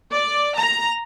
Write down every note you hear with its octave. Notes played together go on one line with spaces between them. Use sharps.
D5
A#5